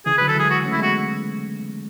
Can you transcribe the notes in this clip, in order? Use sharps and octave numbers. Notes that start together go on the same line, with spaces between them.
C#3 E3 G#4
B4
D3 F#3
A4
E3 G#3
G#4
F#4
A3 C#4
E4
G#3 B3
F#4